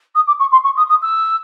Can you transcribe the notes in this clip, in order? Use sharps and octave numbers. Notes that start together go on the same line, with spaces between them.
D#6
D6
C#6
C6
C#6
D#6
D#6
E6